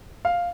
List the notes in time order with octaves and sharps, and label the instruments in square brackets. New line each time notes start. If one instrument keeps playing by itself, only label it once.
[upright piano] F5